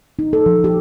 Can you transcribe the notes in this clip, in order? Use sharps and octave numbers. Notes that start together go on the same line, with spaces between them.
D#4
A4
F3
G4